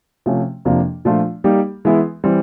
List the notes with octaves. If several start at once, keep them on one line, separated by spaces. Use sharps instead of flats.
C3 F3 A3 C#4
F2 C3 F3 A#3 D4
A#2 F3 A3 D4 F4
G3 A#3 D#4 G4
E3 G#3 B3 E4
E3 G3 C4